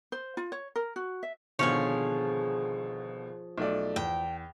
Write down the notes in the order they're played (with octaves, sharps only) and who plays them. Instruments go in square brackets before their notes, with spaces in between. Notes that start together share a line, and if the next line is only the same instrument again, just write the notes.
[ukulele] C5
F4
C#5
A#4
F#4
E5
[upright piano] G#1 B2 D3 [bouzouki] F3 G#4 [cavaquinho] C#5 F5 G#5
[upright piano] B1 A3 D5
[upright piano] E2 [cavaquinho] G5